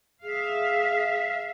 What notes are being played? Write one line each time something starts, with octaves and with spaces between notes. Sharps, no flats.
G#4 E5 F5